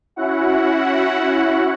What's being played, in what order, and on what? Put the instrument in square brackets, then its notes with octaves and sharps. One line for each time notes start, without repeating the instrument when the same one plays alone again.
[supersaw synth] C#4 E4 F#4 F#5